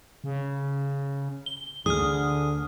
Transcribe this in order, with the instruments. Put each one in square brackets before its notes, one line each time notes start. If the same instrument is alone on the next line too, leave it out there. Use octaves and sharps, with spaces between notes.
[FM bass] C#3
[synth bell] G7
[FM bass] D2 [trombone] D3 [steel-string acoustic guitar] G#4 [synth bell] D#6 F6